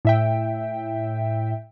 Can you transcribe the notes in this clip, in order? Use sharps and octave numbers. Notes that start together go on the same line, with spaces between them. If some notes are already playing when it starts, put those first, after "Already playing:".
A2 E5 G5